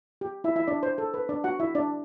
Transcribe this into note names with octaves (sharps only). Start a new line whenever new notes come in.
G4
E4 E5
E4 E5
D4 D5
C5
A4
B4
D4 D5
F#4 F#5
E4 E5
D4 D5